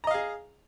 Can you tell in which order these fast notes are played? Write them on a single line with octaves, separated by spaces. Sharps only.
A#5 D#5 F5 G#4